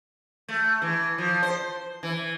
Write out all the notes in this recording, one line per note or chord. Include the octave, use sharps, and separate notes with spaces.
A3
E3
F3
C5
E3